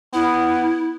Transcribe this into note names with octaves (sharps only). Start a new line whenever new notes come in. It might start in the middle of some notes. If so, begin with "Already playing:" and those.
B3 E4